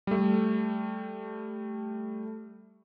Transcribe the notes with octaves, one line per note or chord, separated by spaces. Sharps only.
G3 A3